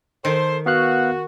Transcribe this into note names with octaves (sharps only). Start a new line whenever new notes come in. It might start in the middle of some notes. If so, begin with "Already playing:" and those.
D#3 A4 C5
B3 F#4 F5 F#6